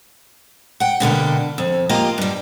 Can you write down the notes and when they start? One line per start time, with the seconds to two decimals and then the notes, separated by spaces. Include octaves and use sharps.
0.80 F#5 G5
1.00 B2 D3 A#3 G4
1.58 F2
1.89 A#3 F4 G4 D#5
2.18 G2 G3